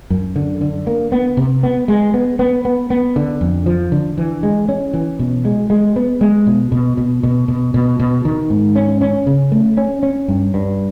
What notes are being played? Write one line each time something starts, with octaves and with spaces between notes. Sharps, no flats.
F#2
D3
D3
A#3
B3
C3
B3
G#3
B3
B3
B3
B3
D3
F2
F3
D3
E3
G#3
C#4
E3
B2
G#3
G#3
B3
G#3
B2
B2
B2
B2
B2
B2
B2
D#3
G#2
C#4
C#4
C#3
A3
C#4
C#4
G2
G2